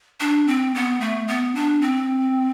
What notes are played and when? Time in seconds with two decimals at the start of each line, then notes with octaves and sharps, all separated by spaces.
0.20 D4
0.47 C4
0.75 B3
1.00 A3
1.28 B3
1.55 D4
1.82 C4